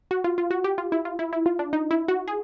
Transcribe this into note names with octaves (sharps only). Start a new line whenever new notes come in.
F#4
F4
F4
F#4
G4
F4
E4
F4
E4
E4
F4
D4
D#4
E4
F#4
G#4